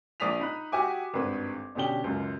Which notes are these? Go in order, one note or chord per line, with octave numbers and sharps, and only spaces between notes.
A#1 D5 D#6 B6 F7
D#4 B5 F#6
F#4 G4 E5 G#5 D6
G#1 G2 A3 B4
B2 D3 C#4 G4 G7
C#2 F#2